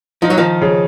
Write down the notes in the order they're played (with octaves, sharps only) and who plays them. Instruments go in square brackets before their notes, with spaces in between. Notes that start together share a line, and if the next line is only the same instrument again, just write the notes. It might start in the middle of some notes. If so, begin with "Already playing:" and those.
[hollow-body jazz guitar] F3 [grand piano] D#4
[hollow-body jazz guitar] F#3
D#3 F3
[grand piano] C#3